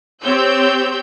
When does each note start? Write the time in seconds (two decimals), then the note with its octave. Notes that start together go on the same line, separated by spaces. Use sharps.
0.22 C4 G4 C#5 E6 G6